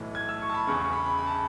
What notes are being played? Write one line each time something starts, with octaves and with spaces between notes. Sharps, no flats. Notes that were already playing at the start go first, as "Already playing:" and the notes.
Already playing: B1 A2 E3
G#6
E6
C#6
A5
B5
E1 E2 C#3 C#6
C#6
B5
B5
B5
A5